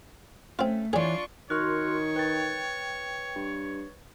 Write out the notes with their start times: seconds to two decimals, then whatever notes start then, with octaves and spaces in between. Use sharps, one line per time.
0.59 A3 C4 C#4 F4
0.93 E3 D4 F4 G#4 C#5 D5 C#6
1.50 D#3 F#4 A#4 C#5 C6 C#6 F6 F#6
2.16 B4 G5 A6
3.36 G2